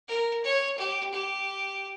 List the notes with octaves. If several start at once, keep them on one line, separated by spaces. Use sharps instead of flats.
A#4
C#5
G4
G4